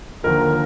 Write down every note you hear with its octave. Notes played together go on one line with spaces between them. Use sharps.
D#2 D3 F3 A#4